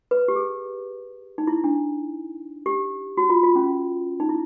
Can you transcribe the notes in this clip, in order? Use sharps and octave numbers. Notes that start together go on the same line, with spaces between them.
B4
G4
G#4
D#4
E4
D4
G4
F#4
F4
F4
C#4
D#4
E4